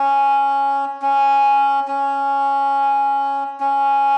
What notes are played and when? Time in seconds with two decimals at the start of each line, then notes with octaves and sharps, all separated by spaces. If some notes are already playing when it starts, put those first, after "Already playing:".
Already playing: C#4
1.02 C#4
1.88 C#4
3.60 C#4